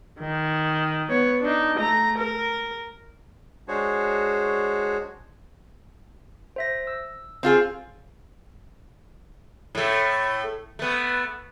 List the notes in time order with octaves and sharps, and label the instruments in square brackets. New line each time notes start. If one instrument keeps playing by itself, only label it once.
[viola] D#3
B3 C#5
D4 D#4
A3 A#5
A#4
[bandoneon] G#3 D4 F#4 G#4 C5 C#5
[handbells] C5 E5 A#6
E6
[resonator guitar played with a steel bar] C4 F4 G#4
[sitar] A2 A3
A3 B3